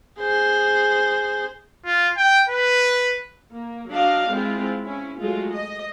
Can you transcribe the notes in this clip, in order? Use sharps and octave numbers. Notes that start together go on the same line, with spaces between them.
G#4 C5
F4
G5
B4
A#3
F#3 D4 D#5 F5
G#3 C4 E4 F4
C#4 E4
F#3 G#3 A3 F4
D#5